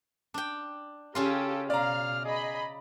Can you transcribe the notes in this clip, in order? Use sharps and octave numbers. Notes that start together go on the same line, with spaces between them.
D4 G5
C#3 C#4 F4 G4 A4
B2 D5 F5 A#5 F6
G#4 D#5 B5